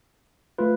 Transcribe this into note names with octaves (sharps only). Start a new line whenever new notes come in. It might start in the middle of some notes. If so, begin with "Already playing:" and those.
A3 F4 B4